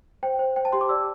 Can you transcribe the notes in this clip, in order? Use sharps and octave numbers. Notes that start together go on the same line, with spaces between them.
C5 G5
C5
C5 G5
A5
G4 C6
D6
D5 E6